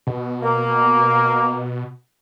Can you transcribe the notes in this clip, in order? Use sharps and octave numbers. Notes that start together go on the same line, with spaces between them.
B2
A#3